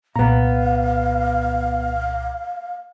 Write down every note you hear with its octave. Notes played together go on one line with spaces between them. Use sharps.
C2 A#2 B3 F5 A#5